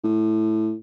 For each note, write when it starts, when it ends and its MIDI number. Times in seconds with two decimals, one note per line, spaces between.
0.04 0.75 45